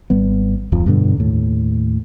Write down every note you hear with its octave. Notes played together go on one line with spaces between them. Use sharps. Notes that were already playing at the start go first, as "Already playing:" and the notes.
G#1 G3 B3
D1 F2 F3
G2 B2 D3
D#2 A2